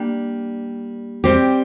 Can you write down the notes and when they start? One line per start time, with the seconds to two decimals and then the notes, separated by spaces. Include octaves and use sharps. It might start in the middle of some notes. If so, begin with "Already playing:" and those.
Already playing: G3 A#3 D4
1.24 G3 C4 G4